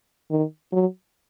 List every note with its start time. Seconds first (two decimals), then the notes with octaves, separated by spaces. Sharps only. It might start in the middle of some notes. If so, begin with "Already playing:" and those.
0.31 D#3
0.73 F#3